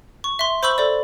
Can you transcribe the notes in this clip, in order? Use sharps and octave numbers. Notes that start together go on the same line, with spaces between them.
C#6
E5 C6
C5 B5 C#6 E6 G6 F#7
A4 C5 D5